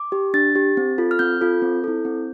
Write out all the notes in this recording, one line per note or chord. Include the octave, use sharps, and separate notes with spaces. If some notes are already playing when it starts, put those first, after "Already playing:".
Already playing: D6
G4
D4 A6
G4
C4
F4 A4
F6
C4 G6
F4 A4
C4
E4 A4
C4